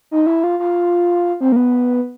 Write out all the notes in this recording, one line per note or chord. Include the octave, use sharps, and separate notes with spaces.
D#4
E4
F4
F4
C4
A#3
B3